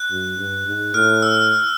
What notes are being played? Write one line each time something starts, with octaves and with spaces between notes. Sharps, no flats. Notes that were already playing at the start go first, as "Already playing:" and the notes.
Already playing: F#6
F#2
G2
G#2
A2 F6
E6